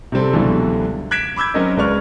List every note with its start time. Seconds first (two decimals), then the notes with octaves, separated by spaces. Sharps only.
0.12 C3 G3 C4 A4
0.33 C#2 B2 D3 E3 F#3 G3
1.11 F#6 G#6 B6 D7 E7
1.36 B5 D6 E6 G6 G#6
1.54 F#3 C4 C#4 F#4 A#4 D#5
1.77 C#2 G#3 B4 D5 C#6 F6